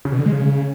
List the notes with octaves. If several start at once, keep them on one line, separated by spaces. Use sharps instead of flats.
C#3
B2
D3
G#3
C#3